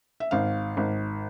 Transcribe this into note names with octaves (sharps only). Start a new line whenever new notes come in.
E5
G#1 F5
G#1